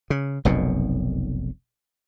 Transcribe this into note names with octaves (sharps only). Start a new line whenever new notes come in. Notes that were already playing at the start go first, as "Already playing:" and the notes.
C#3
F1 B1 F#2 B2